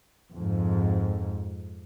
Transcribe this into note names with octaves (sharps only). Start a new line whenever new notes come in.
F2 G#2